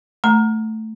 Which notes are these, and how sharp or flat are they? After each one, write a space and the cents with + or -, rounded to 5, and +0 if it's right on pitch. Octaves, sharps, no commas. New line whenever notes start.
A3 +0 A#5 +0